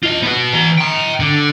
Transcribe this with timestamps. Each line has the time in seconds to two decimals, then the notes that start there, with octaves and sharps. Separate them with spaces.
0.03 F4 D#5
0.22 B3 F#4
0.53 E3 A#5
0.77 G5 A#5
1.20 D3